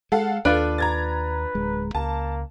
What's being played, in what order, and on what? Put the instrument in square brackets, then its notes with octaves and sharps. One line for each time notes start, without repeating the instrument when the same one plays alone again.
[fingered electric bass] G#3 [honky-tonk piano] A4 F5 F#5
[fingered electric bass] D#2 [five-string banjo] D4 F4 A4 [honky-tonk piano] B4
[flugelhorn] B4 [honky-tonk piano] A#5 G#6 A6
[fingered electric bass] D1 G#3
[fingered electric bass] C#2 [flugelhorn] A#3 [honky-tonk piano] A5